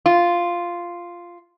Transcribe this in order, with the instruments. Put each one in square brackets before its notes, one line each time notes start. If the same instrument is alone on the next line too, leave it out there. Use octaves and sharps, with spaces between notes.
[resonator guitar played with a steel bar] F4